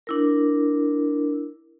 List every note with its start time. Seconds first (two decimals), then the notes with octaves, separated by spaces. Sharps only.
0.07 D4 E4 A#4